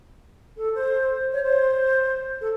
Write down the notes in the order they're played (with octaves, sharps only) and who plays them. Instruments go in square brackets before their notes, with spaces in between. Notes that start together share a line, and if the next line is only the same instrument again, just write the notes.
[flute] A4
C5
C#5
C5
A4